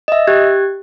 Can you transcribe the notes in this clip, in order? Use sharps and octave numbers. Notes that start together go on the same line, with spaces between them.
D#5 E5
G4 F#6 G#6